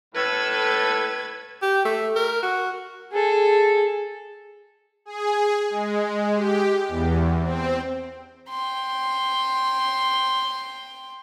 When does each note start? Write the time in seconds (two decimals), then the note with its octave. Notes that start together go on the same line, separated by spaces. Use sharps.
0.15 A2 A4 B4 G#6
1.62 G4
1.85 A3
2.15 A#4
2.43 F#4
3.12 G#4 A4
5.05 G#4
5.70 G#3
6.34 G4
6.88 E2
7.42 C4
8.49 G5 C6